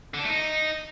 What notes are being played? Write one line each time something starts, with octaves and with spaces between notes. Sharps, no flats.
D3
D4
A3
D#4